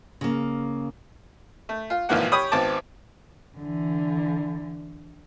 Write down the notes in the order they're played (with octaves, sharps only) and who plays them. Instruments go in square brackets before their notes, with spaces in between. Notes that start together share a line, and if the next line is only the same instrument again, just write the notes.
[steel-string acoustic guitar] C#3 A#3
[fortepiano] A3
F4
G#1 A#2 E3 F3 A#3 F#5
G4 C#5 B5 D#6
G#1 B3 C4 A5 D6
[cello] D3 E3